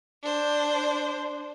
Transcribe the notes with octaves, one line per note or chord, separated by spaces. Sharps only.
D4 C5